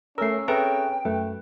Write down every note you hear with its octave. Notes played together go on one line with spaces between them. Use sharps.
A3 C#4 A#4 E6 C7
C4 G#4 A4 B4 E5 G5 A#5
F#2 A3 B4